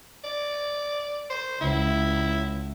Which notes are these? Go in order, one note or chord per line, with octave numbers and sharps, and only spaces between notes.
D5
C5
C#2 E4